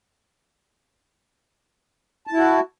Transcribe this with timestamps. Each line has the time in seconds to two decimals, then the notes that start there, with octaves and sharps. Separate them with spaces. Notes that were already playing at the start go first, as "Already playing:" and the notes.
2.27 A5
2.32 E4
2.37 F#4